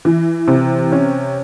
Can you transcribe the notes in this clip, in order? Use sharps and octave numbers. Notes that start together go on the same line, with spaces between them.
E3
C3
C#4